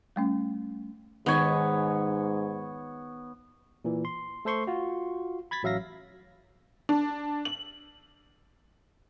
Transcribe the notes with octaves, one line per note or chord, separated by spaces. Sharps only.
G3 A3 C#4
G#2 D#3 B3 C#5 G#5
A#2 E3
C6
A3 A4 C5 C6 C#6
F4 F#4
B5 G#6 A6 B6
A1 F#3 E5 F5 A#6
D4
F#7